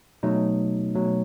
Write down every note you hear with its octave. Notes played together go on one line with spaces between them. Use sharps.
B2 F#3 A3 D#4
B2 F#3 A3